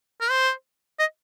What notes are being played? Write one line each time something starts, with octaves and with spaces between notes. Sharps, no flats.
A#4
C5
D#5